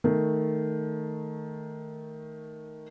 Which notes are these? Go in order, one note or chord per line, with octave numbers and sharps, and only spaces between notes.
D#3 A3